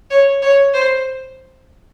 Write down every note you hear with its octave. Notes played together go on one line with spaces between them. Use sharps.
C#5
C#5
C5